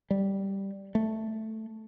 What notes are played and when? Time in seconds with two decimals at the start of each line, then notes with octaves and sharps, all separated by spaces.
0.11 G3
0.95 A3